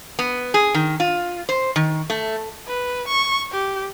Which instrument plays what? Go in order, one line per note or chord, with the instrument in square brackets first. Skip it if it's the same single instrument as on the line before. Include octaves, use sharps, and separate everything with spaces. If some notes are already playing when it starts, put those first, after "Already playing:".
[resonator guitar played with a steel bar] B3
G#4
D#3
F4
C5
D#3
A3
[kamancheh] B4
C#6
G4